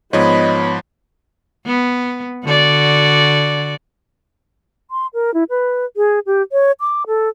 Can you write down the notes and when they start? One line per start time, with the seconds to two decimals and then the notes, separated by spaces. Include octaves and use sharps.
0.13 G#2 F3 B3 C#5 D#5 B5
1.66 B3
2.45 D3 F#4 D5
4.91 C6
5.14 A#4
5.34 E4
5.50 B4
5.97 G#4
6.26 G4
6.52 C#5
6.80 D6
7.07 A4